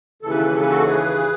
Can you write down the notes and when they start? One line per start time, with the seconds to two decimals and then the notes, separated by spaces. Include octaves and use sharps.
0.22 D#2 C#3 E3 A4
0.30 B4
0.38 A4
0.46 B4
0.54 A4
0.61 B4
0.69 F#4 A4
0.85 G#4 B4